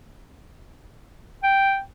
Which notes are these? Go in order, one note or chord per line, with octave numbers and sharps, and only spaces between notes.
G5